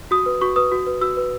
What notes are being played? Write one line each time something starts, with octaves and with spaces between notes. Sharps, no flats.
F#4 D#6
B4
F#4 C#6
B4 D#6
F#4
B4
F#4 E6
B4